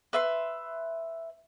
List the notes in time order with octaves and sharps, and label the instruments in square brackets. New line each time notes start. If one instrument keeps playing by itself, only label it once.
[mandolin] B4 E5 C6